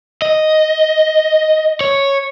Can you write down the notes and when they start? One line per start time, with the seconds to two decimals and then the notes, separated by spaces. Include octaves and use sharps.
0.22 D#5
1.81 C#5